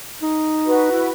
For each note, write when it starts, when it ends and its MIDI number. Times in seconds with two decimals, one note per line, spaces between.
0.22 0.91 63
0.66 1.12 66
0.66 1.12 71
0.92 1.11 64